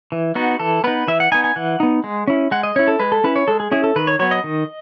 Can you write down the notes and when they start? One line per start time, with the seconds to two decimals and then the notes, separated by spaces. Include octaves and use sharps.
0.12 E3
0.35 B3 D#4 F#4
0.59 E3 A4
0.84 B3 D#4 B4
1.08 E3 E5
1.20 F#5
1.32 B3 D#4 G#5
1.44 G#5
1.56 E3 F#5
1.80 B3 D#4
2.04 G#3
2.28 C#4 E4
2.51 G#3 F#5
2.63 D#5
2.76 C#4 E4 C#5
2.88 A4
3.00 G#3 B4
3.12 A4
3.24 C#4 E4 B4
3.36 C#5
3.48 G#3 A4
3.60 G#4
3.72 C#4 E4 G#4
3.84 A4
3.96 D#3 B4
4.07 C#5
4.19 F#3 B3 C#5
4.31 D#5
4.44 D#3